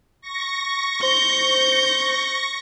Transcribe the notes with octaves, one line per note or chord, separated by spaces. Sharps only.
C#6 A#6
C5 G6